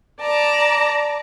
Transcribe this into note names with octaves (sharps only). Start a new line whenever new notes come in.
D5 A5 A#5